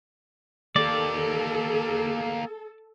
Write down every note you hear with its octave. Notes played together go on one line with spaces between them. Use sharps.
A#3 G4 A4 D5